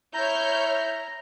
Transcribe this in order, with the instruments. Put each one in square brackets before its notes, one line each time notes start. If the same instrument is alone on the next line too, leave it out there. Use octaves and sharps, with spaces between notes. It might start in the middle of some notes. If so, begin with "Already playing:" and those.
[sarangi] E4 [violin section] C#5 F6 G6 [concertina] A#5